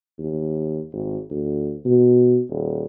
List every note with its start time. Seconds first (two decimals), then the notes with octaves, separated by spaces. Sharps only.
0.19 D#2
0.93 G#1
1.30 D2
1.86 B2
2.50 D#1